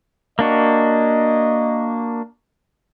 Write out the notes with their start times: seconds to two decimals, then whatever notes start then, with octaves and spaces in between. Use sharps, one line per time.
0.39 A#3 D4 F#4 D#5